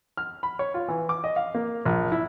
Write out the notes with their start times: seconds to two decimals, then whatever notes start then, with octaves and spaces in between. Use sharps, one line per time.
0.17 F6
0.43 B5
0.59 C#5
0.74 F4
0.88 E3
1.09 D6
1.24 D#5
1.36 F5
1.55 A#3
1.85 A#1
2.12 E4